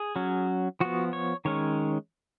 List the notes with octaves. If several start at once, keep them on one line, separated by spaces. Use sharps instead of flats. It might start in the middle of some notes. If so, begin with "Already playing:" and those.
Already playing: G#4
F#3 C#4
F3 B3 F#4
C#5
D#3 G#3 C#4 C#5